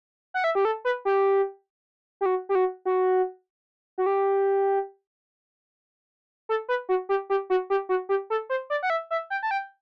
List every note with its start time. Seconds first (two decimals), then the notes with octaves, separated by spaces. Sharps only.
0.34 F#5
0.44 E5
0.55 G4
0.65 A4
0.85 B4
1.05 G4
2.21 G4
2.26 F#4
2.49 G4
2.55 F#4
2.85 F#4
3.98 F#4
4.06 G4
6.49 A4
6.69 B4
6.89 F#4
7.09 G4
7.30 G4
7.50 F#4
7.70 G4
7.89 F#4
8.09 G4
8.30 A4
8.50 C5
8.70 D5
8.83 F#5
8.90 E5
9.11 E5
9.30 G5
9.43 A5
9.51 G5